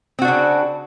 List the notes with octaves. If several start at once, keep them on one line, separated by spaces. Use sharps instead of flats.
C#3 C4 D4 F#4